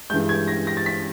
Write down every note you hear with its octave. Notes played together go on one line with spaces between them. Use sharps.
G2 E3 G#3 G6
G#6
A#6
A#6
A6
B6